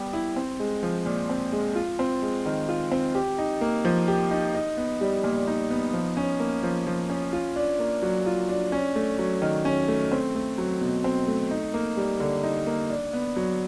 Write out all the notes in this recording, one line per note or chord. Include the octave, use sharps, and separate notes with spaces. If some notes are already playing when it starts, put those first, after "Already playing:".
Already playing: G3 B3 G4
E4
C4
G#3
F3
A#2
C4
G#3
F4
C4
G#3
D#3
F4
C4
G4
D#4
A#3
F3
G4
D#4
D#4
B3
G3
A#2
D#4
B3
F3
C#4
A#3
F3
F3
C#4
F4
D4
A#3
F#3
F4
D4
C#4
A3
F#3
D#3
C#4
A3
C4
A3
F#3
B2
C4
A3
D#4
A#3
G3
D3
D#4
A#3
D4
B3
F#3